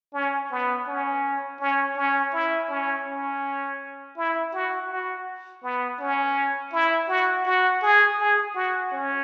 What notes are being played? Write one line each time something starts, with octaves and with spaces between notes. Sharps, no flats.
C#4
B3
C#4
C#4
C#4
E4
C#4
C#4
E4
F#4
F#4
B3
C#4
E4
F#4
F#4
G#4
G#4
F#4
C#4